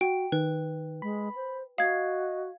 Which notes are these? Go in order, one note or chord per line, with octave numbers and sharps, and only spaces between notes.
F#4 G5
D#3 B4
G#3 B5
C5
F#4 D#5 F5 G#6